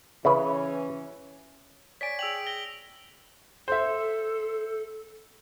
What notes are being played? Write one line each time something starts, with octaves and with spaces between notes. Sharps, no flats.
C#3 E3 C#4 E4 B4
C#5 D5 G#5 B6 D7
G#4 G5 E6 F7 F#7
A#6 G7
A4 C5 E5